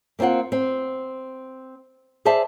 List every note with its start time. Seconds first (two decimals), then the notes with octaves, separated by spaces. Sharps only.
0.19 A#3 C4 D#4 F4 F#5
0.52 C4
2.25 G#4 C5 D5 E5 A5